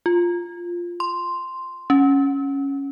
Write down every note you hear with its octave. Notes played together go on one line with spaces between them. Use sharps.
F4
C6
C#4